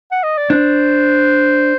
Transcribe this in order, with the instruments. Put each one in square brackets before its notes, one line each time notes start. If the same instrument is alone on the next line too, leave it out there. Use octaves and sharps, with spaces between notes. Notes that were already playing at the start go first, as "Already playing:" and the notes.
[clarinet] F#5
D#5
D5
[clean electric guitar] D4 [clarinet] C5